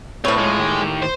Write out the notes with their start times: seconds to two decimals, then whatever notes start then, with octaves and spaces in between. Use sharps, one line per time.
0.25 A2 C4 B4 C#5
0.38 G#2 G#3 D#4 F4
0.60 D#3 G4
1.03 C5